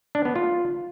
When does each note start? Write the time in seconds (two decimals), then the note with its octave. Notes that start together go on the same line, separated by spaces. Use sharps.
0.15 D4
0.25 B3
0.36 F4